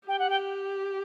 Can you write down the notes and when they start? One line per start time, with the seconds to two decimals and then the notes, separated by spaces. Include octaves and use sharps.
0.08 G4 G5
0.19 F#5
0.30 G5